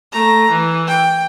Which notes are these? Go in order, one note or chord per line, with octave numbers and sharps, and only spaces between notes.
A3 A#5
E3
G5